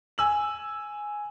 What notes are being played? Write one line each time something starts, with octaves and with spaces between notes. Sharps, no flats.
G#5 E6 F#7